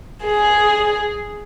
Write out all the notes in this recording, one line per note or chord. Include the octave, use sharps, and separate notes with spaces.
G#4